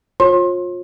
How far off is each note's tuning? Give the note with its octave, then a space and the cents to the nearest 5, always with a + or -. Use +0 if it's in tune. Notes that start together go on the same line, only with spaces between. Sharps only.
F4 +30 C#5 -45 C6 +30